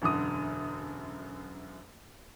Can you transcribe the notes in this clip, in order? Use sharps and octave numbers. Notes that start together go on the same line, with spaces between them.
E1 F#2 D3 D#6